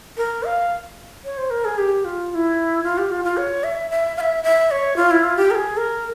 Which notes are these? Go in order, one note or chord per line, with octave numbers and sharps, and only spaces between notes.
A#4
F5
C#5
C5
A#4
G#4
G4
F4
F4
E4
F4
G4
F4
F4
C#5
E5
E5
F5
E5
E5
C#5
F4
E4
F4
G4
A#4
G#4
A#4